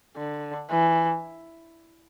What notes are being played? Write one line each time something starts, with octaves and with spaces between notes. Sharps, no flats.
D3
E3